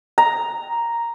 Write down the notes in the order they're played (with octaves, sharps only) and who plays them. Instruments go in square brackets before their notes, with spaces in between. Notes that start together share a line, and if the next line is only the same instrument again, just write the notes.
[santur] A#5